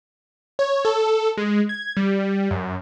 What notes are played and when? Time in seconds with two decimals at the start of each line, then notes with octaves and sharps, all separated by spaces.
0.59 C#5
0.85 A4
1.38 G#3
1.69 G#6
1.97 G3
2.51 F#2